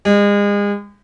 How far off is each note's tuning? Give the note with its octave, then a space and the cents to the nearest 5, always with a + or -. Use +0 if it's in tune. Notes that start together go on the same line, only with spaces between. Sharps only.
G#3 -35